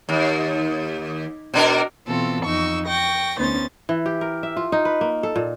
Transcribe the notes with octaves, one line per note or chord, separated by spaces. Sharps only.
D#2
B2 D4 A#4
B2 E3 B3 C4 F4 A4
F2 D#4 C#6 E6
G5 C#6 A#6
D2 B3 C#4 D#4 C5 A6
E3
G4
A#4
E5
F4
D#4
B4
A#3
A4
A#2